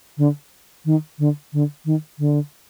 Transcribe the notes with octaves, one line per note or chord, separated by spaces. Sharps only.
D3
D#3
D3
D3
D#3
D3